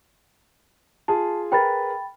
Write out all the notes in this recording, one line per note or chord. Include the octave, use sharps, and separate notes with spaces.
F4 G#4 A5
G#4 A#4 B4 G5 B5 A6